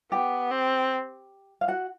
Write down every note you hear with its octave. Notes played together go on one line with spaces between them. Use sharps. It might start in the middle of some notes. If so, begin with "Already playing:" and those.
B3 G4 G5
C4
F5
F#4 F#5